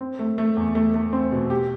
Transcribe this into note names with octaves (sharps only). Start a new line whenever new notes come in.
C4
A3
A3
E2
A3
A3
C4
B2
G4